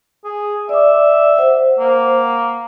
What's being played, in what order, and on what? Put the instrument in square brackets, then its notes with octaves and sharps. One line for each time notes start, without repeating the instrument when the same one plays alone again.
[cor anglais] G#4
[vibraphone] D5 D6 [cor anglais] E5
[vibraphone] C5 F#5
[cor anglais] A#3